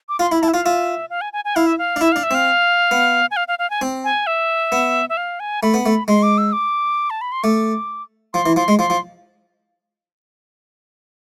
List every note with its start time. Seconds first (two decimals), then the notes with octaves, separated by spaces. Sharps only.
0.09 D6
0.19 F4 C6
0.31 E4 B5
0.42 E4 A5
0.48 E5
0.54 F4 F5
0.65 F4 E5
1.10 F5
1.21 G#5
1.33 G#5
1.45 G#5
1.56 E4 F5
1.67 E5
1.78 F5
1.96 D4
2.01 E4 E5
2.12 D4 F5
2.23 E5
2.31 C4 F5
2.91 B3
3.31 G#5
3.37 F5
3.48 F5
3.59 F5
3.70 G#5
3.81 C4
4.04 G#5
4.27 E5
4.72 B3
5.09 E5
5.17 F5
5.40 G#5
5.63 A3 B5
5.74 B3
5.86 A3
6.08 G#3 C6
6.23 D6
6.38 E6
6.52 D6
7.10 A5
7.21 B5
7.32 C6
7.43 A3 D6
8.34 F3 C6
8.46 E3
8.56 F3 C6
8.68 G#3
8.79 F3 C6
8.90 F3